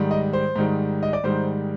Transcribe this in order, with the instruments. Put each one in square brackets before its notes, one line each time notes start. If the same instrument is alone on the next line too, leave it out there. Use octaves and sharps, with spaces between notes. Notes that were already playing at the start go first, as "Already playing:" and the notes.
Already playing: [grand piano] G#2 D#3 G3
D#5
C5
G#2 D#3 G3
D#5
D5
G#2 D#3 G3 C5